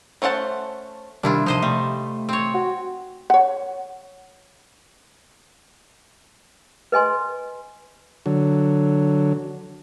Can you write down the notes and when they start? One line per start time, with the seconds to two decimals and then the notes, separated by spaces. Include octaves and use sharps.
0.22 A3 C#4 C5 F#5 A5
1.23 C3 D#3 G3 D4 E4 F4
1.46 C3 F3 D#4 C5 D#5
1.62 C3 G3 A3
2.29 C4 C#5
2.54 F#4
3.30 C#5 F#5
6.92 B4 D#5 G#5 C6
8.26 D3 F#3